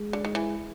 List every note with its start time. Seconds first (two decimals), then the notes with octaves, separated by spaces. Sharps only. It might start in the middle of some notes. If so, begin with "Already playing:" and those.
Already playing: G#3
0.13 D3
0.25 D#3
0.35 E3